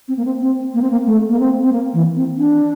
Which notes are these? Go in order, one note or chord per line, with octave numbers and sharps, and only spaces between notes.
C4
A#3
C4
C4
A#3
C4
A#3
A3
A#3
C4
C4
A#3
E3
C4
D4